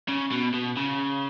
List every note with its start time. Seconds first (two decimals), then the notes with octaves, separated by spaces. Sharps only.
0.09 C#3
0.32 B2
0.54 B2
0.77 C#3